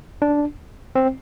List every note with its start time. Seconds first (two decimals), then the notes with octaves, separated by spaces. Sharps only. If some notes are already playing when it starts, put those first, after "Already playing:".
0.22 D4
0.95 C4